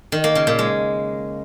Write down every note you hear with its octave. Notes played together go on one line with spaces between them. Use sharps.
D#3
A#3
C#3
A#2
G#3